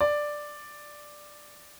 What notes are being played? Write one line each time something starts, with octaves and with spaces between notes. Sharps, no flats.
D5